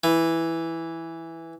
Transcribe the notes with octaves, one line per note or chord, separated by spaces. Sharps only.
E3